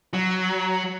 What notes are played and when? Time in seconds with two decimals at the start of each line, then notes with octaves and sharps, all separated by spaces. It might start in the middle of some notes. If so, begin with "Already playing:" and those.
0.14 F#3